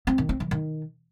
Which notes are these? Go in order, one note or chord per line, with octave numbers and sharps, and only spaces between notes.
C4
D#3
C4
E3
D#3